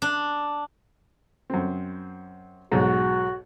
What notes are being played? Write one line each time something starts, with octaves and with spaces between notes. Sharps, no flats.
D4
F#2 C4
B1 G#2 F#4